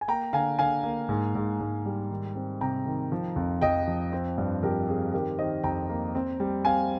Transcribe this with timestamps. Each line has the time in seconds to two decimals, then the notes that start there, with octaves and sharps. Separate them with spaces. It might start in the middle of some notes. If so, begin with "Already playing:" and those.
0.01 G#5
0.08 A#3 G5 A#5
0.33 D3 F5 G#5
0.59 D3 F5 G#5
0.83 A#3
1.09 G#2
1.35 G#2
1.60 G#2
1.85 G3
2.10 D#3
2.35 C4
2.61 C3 G5 A#5
2.86 D#3
3.12 F3
3.36 F2
3.61 F2 D#5 G5
3.88 F3
4.12 C4
4.38 G2
4.63 F3 G4 A#4
4.88 C4 G#4
5.13 D#3 G4 A#4
5.39 D#3 C5 D#5
5.63 F2 G5 A#5
5.90 A#3
6.15 C4
6.40 G3
6.65 C4 F5 G#5